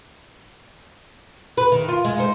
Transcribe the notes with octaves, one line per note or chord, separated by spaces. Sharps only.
B4
D#3
F4
G#3
D#4 C5